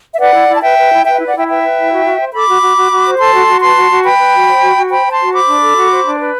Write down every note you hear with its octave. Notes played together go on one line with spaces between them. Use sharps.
E5
B4 D5 F#5
E4
E4
A5
B4 E5 G5
B4
E4
B4 E5 G5
E5
E4
D5 F#5
E4 E5 G5
B4 E5 G5
B4
E4
F#4
F#4
C5
A4 B5 D6
F#4
F#4
F#4
F#4
C5
A4 A5 C6
F#4
F#4
B4 A5 C6
F#4
F#4
B4 G5 B5
B4
F#4
C5
F#4
F#4
C5 G5 B5
C5
A5 C6
F#4
C5 B5 D6
D4
A4
F#4
C5
D4
B4